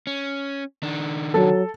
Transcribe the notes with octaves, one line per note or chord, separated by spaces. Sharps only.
C#4
D#3 D4
F#3 A4